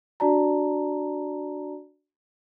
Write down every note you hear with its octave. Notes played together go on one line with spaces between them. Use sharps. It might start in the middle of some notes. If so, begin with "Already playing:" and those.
D4 F#4 D5 A5 A#5